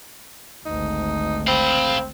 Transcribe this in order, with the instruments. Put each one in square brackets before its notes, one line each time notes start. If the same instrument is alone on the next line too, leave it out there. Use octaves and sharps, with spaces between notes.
[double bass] G#1 D2 [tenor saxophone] D#4
[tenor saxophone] C4 [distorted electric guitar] F5 B5